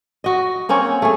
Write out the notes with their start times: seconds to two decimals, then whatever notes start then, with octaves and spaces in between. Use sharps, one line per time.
0.24 F#4 D#5
0.69 A#3 C4 C#4 C#5
1.02 A3 G#4